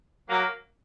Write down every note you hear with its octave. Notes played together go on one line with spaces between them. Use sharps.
F#3 A#3